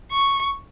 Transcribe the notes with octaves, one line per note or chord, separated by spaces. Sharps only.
C#6